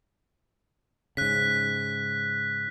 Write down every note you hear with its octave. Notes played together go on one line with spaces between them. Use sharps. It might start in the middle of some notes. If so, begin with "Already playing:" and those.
G#2 C#3 F#6 B6